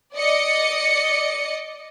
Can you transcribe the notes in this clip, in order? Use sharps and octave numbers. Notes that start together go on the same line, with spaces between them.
D5 D#5 C#7